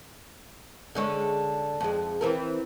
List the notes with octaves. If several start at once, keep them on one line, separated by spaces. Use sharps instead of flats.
D3 G#3 C#4
F2 G#3
E3 C4 A#4